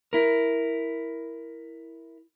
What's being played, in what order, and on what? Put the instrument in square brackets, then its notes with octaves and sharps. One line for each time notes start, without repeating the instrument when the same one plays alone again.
[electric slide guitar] E4 A#4